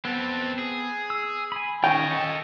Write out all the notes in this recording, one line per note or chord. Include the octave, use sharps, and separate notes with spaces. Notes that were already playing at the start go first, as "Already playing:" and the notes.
B3 C4 A4
G#4
E6
G#5 B5
D#3 C#4 F4 C#5 D#5 G5
A4